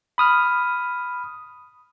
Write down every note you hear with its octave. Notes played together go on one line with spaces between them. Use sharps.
B5 D#6 F6